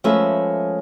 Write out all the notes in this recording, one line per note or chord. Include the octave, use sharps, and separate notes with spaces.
F3 G#3 A3 C#4 B4 E5